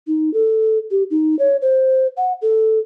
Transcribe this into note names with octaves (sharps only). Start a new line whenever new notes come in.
D#4
A4
G4
D#4
C#5
C5
F#5
A4